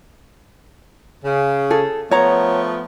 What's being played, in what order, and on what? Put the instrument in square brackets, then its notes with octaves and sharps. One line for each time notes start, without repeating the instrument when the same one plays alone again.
[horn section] C#3
[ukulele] G#4 A4
[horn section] F3 A3 B3 [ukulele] C#5 A#5